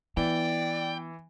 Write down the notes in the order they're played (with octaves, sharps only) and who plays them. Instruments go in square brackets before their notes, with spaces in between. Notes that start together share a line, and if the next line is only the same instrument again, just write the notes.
[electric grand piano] E3 [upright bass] B3 [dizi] D5 [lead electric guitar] G5